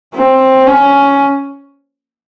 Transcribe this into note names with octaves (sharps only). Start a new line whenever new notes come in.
C4
C#4